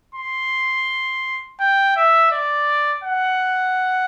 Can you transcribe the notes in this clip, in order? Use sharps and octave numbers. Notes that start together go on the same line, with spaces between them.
C6
G5
E5
D5
F#5